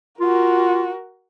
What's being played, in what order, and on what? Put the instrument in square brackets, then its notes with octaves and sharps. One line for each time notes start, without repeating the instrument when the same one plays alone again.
[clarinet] F4 [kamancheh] F#4 A#4